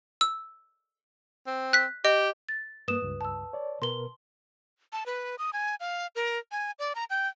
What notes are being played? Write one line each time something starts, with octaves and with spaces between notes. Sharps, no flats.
E6
C4
F#6 B6
G4 D#5
A6
G2 A#3 B4 D#6 E7
C#2 G2
A5 E6
C#5 D5
B2 A#4 B4 C6 G7
A5
B4
D#6
G#5
F5
A#4
G#5
D5
A#5
G5